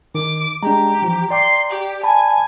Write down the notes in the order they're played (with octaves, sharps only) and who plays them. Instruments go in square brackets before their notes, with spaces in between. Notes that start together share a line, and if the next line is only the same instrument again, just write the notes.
[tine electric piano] D#3 [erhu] D6
[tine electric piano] G#3 D4 [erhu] G4 [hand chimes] A#5
[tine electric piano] E3 F3
[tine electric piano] D5 G5 D6 [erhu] C6
[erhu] G4
[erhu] G#5 [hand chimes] A5 B5